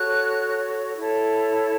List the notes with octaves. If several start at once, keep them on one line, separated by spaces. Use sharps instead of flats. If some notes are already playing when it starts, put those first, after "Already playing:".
Already playing: F#4 A4 C#5 F#6
E4 A4 C#5